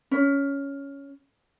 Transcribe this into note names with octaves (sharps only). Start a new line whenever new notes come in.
C#4